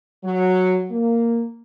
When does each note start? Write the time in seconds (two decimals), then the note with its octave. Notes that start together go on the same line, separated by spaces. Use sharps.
0.24 F#3
0.90 A#3